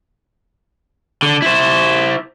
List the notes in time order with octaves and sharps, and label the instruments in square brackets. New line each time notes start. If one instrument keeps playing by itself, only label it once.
[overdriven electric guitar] D3
E4 C5